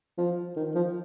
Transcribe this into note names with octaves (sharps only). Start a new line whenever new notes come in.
F3
D#3
F3